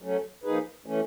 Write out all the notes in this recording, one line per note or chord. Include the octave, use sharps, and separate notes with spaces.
F#3 A3 C#4
F3 A#3 D#4 G#4 B4
E3 A3 C#4